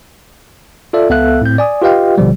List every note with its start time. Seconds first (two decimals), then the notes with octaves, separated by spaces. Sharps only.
0.93 F4 A4 D5 E5
1.10 C#2 B3 A4 E5 F5 F#6
1.41 A2 C4 G6
1.58 D5 G#5 D#6
1.82 F4 G4 B4 D#5 F5 G5
2.18 G#1 B2 D3 F3 G3